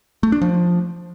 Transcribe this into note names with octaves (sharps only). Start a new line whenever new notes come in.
A3
D4
F3